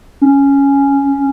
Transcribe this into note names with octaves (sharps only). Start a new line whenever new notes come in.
C#4